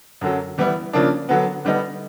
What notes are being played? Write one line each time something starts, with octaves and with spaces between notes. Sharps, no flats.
F#2 D3 F#3
E3 G3 B3 E4
C#3 F3 A#3 D4
D3 F#3 B3
D3 G3 B3 D#4